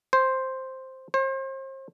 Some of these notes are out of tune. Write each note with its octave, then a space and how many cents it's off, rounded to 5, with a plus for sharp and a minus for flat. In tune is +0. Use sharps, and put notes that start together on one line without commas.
C5 +5
C5 +40